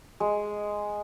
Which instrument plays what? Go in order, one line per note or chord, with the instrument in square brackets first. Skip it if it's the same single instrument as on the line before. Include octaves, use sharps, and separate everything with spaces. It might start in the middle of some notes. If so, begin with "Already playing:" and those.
[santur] G#3